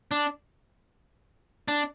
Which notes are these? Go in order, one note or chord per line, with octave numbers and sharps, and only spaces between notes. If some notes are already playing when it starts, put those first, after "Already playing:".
D4
D4